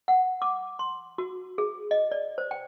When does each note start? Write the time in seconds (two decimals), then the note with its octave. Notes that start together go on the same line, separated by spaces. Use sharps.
0.08 F#5
0.42 D6
0.79 C6
1.18 F#4
1.58 G#4
1.91 D#5
2.12 D5
2.38 C5
2.51 G5